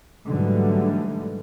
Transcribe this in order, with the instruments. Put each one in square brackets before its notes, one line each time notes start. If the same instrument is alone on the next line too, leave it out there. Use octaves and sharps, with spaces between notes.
[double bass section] G#2 D3 E3 F#3 G3 A3